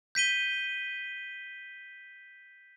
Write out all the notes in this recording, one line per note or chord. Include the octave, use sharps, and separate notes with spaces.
G6 B6 D#7 G7